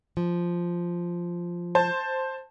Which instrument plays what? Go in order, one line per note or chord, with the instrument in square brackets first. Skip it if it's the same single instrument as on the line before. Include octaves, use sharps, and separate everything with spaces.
[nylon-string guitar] F3
[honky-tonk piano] C5 A5